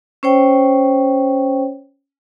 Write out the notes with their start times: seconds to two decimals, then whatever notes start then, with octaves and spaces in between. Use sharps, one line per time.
0.23 C#4 C5 C#5 G5